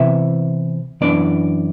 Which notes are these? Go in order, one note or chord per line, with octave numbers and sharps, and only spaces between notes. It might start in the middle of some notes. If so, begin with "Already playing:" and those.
Already playing: C3 E3 B3 E5
F#2 E3 B3 D4 D5